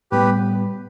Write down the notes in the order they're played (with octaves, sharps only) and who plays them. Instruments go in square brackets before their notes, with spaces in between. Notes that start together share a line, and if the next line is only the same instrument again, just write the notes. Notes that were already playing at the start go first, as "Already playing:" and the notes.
[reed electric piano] A2 G3 B3 [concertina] G4 B4